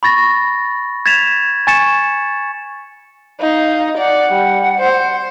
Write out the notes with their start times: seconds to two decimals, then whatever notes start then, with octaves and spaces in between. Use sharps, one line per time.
0.03 B5 C#6 A6 A#6
1.06 G#6 A6 B6 E7 F7
1.67 G#5 C#6 A6 C#7 E7
3.40 D#4 F5
3.98 D5 F#5
4.32 G3
4.79 C5